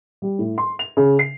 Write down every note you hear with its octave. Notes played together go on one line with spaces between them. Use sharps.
G3
A2
C6
F7
C#3
C7